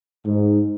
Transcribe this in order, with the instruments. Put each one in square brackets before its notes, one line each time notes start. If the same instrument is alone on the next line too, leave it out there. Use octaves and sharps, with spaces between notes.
[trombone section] G#2